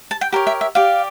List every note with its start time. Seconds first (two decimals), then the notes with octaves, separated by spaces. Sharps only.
0.11 A5
0.21 G5
0.32 G4 A#4 C#5
0.47 E5
0.61 E5
0.75 G4 D5 F5